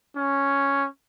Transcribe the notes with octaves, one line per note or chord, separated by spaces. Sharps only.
C#4